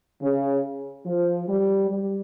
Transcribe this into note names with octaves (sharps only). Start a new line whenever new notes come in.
C#3
F3
G3
G3